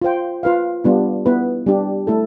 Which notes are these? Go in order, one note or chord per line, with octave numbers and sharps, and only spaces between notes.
F4 C5 G5
F4 B4 F5
G3 B3 D4 F4
B3 E4 B4
G3 D4 G4
A3 E4 A4